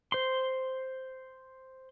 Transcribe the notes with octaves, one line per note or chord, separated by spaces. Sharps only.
C5 C6